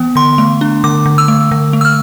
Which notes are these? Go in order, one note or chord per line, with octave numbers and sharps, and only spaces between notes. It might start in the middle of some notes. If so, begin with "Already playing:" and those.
Already playing: E3 B3
D3 C6
A3
D4
D3 D6
D3
E6
A3
D3
A3
E6
F6